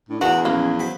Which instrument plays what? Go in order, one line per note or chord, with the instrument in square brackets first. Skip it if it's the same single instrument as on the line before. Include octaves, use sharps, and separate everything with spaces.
[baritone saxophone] A2 [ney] D4
[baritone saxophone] E2 [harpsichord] A#3 B3 D4 [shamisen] F#4 [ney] G#5
[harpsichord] A#1 [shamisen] A#3 [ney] C#4
[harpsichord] F#3 B5 [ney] C5